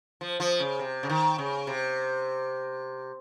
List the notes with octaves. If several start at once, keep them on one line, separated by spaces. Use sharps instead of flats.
F3
F3
C#3
C3
C#3
D#3
C#3
C3